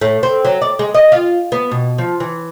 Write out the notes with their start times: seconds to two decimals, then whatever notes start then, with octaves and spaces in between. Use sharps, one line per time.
0.01 A2
0.23 C4
0.45 F#3
0.62 D5
0.79 G#3
0.95 D#5
1.12 F4
1.52 B3
1.71 B2
1.98 F3
2.20 E3